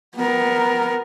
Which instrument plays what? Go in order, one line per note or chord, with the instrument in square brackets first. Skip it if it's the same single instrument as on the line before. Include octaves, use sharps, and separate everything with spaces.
[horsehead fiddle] B3 A#4